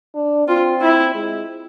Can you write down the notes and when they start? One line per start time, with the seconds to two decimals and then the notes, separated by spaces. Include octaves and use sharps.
0.15 D4
0.48 C4 F4
0.82 E4
1.15 G#3